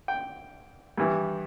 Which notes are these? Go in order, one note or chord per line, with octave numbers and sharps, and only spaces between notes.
G5
G2 E3 G3